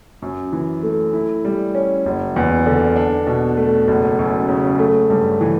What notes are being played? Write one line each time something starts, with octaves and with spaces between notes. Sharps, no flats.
F#2
E3
A3
E4
G3
C#4
F#1
E2
D3
D4
B2
A3
F#1
F#2
C#3
A3
G2
E3